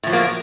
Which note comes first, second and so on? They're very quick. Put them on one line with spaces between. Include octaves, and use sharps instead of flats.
A2 F3 F#3 A#3